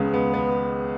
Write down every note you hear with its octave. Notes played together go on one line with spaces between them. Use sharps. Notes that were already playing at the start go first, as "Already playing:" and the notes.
Already playing: C#2 C#3 G#3 B3
B3
B3